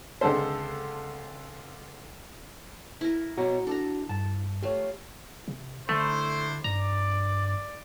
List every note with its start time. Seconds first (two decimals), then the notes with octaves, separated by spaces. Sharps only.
0.21 C#2 D3 G#3 C4 A4 C5
3.01 E4 A#4
3.37 B2 F#4 C#5 A#5
3.67 D4 A4 A#5
4.09 G2 A5
4.63 A3 F4 G4 C#5
5.48 C3
5.89 D3 A3 D4 E4 C5
6.64 G2 D5 A#5